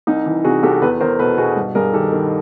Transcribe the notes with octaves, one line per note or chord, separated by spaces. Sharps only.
C2 D#4
E3
C3 F#4 G#4
C2 G4 A4
E2 A4 B4
E2 A#4 C5
B2 A4 B4
B2 F#4 G#4
G2
G2 G#4 A#4
D#3 G4 A4
D#3